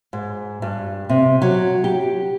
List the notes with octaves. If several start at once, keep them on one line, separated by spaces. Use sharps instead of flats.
G#2
G2
C3
F#3
G4